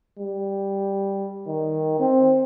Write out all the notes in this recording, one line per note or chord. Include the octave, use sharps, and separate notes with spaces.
G3
D#3
C4